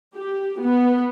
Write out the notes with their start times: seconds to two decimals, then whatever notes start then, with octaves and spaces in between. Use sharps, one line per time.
0.16 G4
0.61 B3